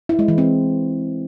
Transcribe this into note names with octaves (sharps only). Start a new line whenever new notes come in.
E4
G#3
E3
C4